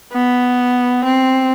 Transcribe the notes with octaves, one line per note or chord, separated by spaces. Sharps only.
B3
C4